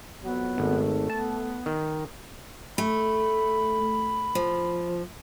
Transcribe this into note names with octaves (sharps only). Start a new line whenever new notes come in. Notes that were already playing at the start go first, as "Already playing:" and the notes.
F2 F#3 B3
G#1 A3 A4
B3 A5
D#3
A3 B5
F3